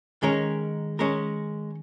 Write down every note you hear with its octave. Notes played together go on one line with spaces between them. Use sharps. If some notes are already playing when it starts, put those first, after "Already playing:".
D#3 G#3 C#4 A#4
G#3 C#4 A#4